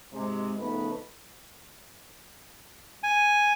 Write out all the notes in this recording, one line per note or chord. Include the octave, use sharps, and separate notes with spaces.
G#2 C3 G#3
C#3 F3 A3 B3 D#4 B4
G#5